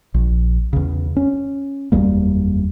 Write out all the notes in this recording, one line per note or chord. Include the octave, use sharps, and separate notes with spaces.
A#1
E2 C#3
C#4
F#1 E2 G3 A#3